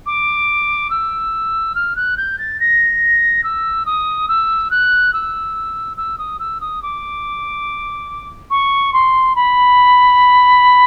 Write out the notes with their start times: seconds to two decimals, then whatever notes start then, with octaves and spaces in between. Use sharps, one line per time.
0.06 D6
0.90 E6
1.75 F6
1.96 F#6
2.17 G6
2.38 A6
2.60 A#6
3.43 E6
3.85 D#6
4.28 E6
4.71 F#6
5.13 E6
5.97 E6
6.18 D#6
6.39 E6
6.60 D#6
6.82 D6
8.50 C#6
8.93 C6
9.35 B5